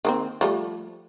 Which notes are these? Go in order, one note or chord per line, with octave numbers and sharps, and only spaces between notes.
D#3 A#3 C4
F3 G3 A3